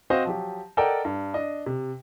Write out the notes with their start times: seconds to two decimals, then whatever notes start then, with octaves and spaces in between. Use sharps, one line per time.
0.10 C4 F#4 C5 D#5 F5
0.25 F3 F#3 G4
0.77 A4 A#4 D5 D#5 F#5 G5
1.05 G2
1.34 D4 D#5
1.66 C3